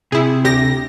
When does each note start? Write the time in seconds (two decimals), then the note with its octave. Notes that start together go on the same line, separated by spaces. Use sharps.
0.12 C3 E4 G#4
0.44 D2 G4 A#6